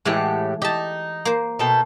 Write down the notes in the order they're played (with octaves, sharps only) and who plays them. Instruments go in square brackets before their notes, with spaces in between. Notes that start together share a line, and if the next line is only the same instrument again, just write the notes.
[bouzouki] A2 G4 F#5 [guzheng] E3 G#3
[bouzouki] D#4 [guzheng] G4 A5
[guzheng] A#3 C5
[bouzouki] B2 A4 G5